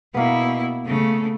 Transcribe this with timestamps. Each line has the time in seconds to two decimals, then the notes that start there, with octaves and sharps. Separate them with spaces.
0.14 B2 A#3 B3 E4
0.86 C#3 A3